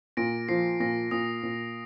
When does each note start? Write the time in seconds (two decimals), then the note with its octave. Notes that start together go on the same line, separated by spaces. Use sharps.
0.17 A#2 A#6 D7
0.49 F3 C7
0.80 A#2 A#6
1.11 A#2 D#6
1.43 A#2